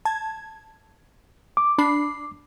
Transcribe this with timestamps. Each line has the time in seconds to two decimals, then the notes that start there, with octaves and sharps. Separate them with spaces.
0.05 A5 G#6
1.57 D6
1.78 D4 B5 C7